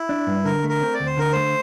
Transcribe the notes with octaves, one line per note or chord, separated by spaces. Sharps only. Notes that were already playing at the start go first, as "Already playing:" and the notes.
Already playing: E4
D4
G2
D3 A#4
A3
A#4
C4
D5
D2
C5
D3 A#4
A3 C5